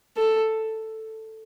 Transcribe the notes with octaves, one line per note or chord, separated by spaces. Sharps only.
A4